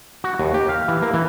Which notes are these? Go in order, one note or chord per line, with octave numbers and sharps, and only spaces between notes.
F#4
D#2
G4
F5
E3
A#3
E3